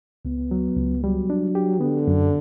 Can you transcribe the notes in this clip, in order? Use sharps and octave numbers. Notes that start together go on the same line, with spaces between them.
C#2 B3
F#3
C#2
F#3 G3
D4
G4
D3 B3
F#2